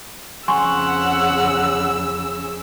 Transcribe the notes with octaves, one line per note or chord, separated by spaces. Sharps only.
F2 C#3 F#5 G#5 C6 C#6 E6